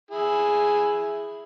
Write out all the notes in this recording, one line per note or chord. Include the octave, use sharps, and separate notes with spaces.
E4 G#4